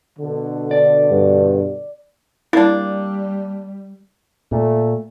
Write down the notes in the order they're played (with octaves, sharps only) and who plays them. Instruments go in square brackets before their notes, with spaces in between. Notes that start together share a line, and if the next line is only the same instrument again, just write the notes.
[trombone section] B2 D3
[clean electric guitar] D5
[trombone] G2
[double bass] G3 [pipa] A#3 D4 [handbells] E4
[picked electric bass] A#2 [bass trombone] A3